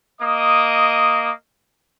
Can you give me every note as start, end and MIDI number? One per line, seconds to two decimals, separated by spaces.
0.20 1.29 58
0.20 1.29 75
0.20 1.29 87